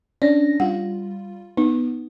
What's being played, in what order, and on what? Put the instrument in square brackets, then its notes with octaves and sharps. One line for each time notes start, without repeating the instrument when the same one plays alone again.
[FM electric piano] C#4 D4 A#6 [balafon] D5
[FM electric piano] G3 F4 [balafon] F#5
[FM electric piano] B3 [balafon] D#4